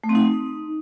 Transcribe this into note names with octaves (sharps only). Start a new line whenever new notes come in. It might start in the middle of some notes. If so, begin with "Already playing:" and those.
A3
C4
D#4